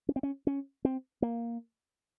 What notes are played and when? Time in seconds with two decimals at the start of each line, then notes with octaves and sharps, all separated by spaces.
0.09 C#4
0.16 C4
0.23 C#4
0.47 C#4
0.85 C4
1.22 A#3